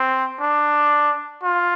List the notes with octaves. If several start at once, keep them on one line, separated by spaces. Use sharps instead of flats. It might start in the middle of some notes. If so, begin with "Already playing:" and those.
Already playing: C4
D4
F4